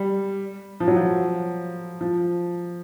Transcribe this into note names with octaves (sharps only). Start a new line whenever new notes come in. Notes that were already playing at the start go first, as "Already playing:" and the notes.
Already playing: G3
F3
F#3
F3
F3